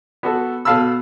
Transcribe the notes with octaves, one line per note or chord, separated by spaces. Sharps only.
B3 F#4 A4
B2 A4 F5 A5 B5 E6